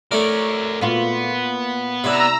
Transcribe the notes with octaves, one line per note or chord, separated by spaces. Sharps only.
A3 E4 A#4 C#5 D5
A#2 B3 F4 F#4
C3 D4 E4 E5 A#5 E6